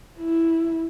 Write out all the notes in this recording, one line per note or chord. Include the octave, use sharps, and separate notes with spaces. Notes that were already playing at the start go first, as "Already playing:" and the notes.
E4